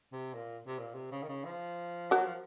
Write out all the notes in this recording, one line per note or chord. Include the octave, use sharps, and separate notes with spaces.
C3
A#2
C3
A#2
C3
C#3
D#3
C#3
F3
F#3 F#4 A#4
F3